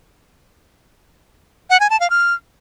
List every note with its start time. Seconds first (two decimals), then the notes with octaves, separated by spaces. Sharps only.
1.70 F#5
1.80 G#5
1.90 A5
2.00 F5
2.10 F6